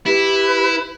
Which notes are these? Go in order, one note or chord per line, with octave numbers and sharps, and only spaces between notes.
E4 G4 B4